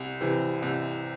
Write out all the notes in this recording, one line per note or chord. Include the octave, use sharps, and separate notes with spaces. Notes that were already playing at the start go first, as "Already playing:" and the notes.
Already playing: C2
C3 E3
C2